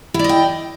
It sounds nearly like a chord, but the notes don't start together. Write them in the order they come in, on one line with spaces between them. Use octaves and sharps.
E4 D5 D#5 G5